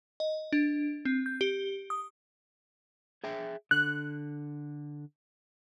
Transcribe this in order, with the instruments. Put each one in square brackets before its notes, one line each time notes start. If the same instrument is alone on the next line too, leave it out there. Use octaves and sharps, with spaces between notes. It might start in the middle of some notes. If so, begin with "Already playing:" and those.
[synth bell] D#5
D4
C4
G6
G4
D#6
[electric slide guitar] G#4 E5 G5
[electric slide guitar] D3 [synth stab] F#6